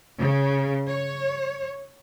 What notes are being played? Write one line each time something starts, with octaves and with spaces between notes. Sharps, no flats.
C#3
C#5